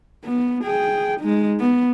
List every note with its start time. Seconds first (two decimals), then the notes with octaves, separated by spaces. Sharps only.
0.25 B3
0.64 G#4 G5
1.20 G#3 D#4
1.60 B3